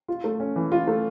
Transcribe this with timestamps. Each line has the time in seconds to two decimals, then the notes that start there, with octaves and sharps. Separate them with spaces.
0.08 F4
0.24 A3
0.40 C#4
0.56 E3
0.72 F4
0.87 A3